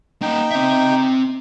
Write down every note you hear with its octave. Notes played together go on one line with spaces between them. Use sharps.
A#3 D#4 F#5 G5
C4 E5